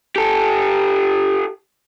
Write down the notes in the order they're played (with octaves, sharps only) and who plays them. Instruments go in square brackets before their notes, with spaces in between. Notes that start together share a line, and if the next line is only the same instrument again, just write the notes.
[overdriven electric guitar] G4 A4